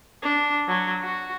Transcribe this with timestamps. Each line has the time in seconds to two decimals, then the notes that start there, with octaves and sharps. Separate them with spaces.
0.23 D4
0.68 F#3
1.03 F#4